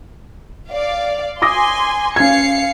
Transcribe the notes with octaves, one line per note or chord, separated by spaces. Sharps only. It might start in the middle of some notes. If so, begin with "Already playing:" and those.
D5 F5
G#5 C6 D6 D#6 A#6
C#4 F5 G#6 C7 C#7